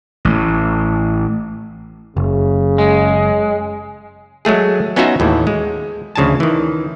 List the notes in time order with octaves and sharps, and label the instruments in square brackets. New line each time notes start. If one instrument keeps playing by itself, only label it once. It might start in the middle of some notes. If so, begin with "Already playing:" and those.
[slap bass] A1 A2
[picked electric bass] F#1 [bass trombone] C#3
[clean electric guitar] G#3
[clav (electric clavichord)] F#3 G#3 A3 G#4
B3 C#4 D#4 F4 F#4 E5
D#2 A2 E3
G#3
D2 C#3 F3 G#5 A5
D#3 E3